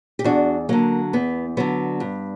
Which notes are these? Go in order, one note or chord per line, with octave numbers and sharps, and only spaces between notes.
G4
E2 D4 F#4
D3 F#3 A#3
E2 B3
D3 F#3 B3
G2